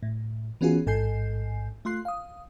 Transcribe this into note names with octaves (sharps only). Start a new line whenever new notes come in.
A2
E3 B3 C#4 F4 F#4 G#4
A1 G#2 A4 G#5 G6 C7
A3 F4 C6 F#6 C7
F5 D#6